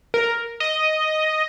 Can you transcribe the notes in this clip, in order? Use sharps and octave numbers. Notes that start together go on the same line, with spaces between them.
A#4
D#5